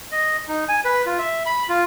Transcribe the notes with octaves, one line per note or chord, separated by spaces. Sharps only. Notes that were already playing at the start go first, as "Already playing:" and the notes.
D#5
D#4
G#5
B4
F4
E5
B5
F4